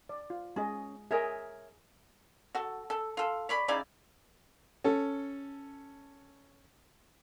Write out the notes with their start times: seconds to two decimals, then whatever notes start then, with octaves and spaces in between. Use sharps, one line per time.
0.09 D5
0.30 F4
0.56 G#3 C#4 G#4 D#5
1.11 G#4 A#4 C#5 D#5 E5 G#5
2.55 F#4 A4
2.90 A4
3.17 F4 A4
3.49 C#5 D5 B5
3.68 C#3 D#4 E4 D5
4.84 C#4 A4